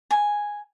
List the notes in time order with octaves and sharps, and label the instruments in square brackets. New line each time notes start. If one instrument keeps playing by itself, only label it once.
[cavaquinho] G#5